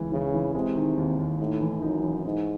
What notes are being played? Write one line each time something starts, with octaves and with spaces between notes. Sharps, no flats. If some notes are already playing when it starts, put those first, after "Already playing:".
Already playing: C#2 E3
C#3 E3
E3
C3 G#3
D#3
D#2
D#2
A2 D#4
E3
F#2 D#4
E3
G#2 D#4